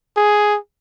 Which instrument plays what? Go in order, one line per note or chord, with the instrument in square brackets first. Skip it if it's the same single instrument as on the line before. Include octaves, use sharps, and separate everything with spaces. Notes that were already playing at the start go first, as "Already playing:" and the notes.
[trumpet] G#4